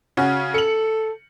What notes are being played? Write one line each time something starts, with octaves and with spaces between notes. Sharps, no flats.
C#3 C#4 F#4
A4 C#7 F#7